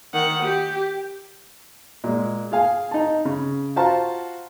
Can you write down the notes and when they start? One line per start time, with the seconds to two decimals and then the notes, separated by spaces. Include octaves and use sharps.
0.14 D#3 F#5
0.43 G4
2.04 A#2 G#3
2.52 G#4 F5 G#5
2.91 D#4 A5
3.25 C#3
3.76 F4 F#4 C5 F5 A5 A#5